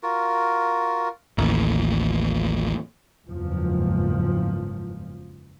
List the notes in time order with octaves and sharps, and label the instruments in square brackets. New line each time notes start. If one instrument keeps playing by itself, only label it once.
[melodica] F4 F#4 A#4
[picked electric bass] A1 D#2
[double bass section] F#1 E2 G#2 F3